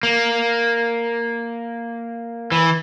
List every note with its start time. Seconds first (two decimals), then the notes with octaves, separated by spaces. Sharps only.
0.03 A#3
2.52 E3